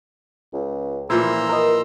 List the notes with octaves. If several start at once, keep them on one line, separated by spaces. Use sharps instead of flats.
C#2
A#2 E3 F3 E4 A#5 C6 E6
A#4 D#5